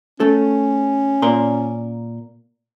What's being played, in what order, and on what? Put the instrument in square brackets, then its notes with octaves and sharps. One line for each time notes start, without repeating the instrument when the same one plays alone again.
[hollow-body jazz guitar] A3 A4 [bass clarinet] C#4
[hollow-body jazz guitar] A#2 A#4 C6